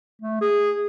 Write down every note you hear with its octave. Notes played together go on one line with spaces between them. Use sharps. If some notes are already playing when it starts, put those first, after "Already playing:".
A3
G#4